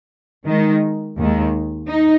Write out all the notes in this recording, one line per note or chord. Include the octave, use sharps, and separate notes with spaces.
D#3 G#3 D#4
D#2 D#3 G#3
D#4